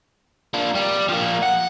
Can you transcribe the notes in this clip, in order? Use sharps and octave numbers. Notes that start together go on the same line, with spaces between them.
A#3 D4
G3
F3 A#3
F#5